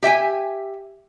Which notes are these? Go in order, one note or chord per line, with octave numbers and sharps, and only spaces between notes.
G4 E5 G5 G#5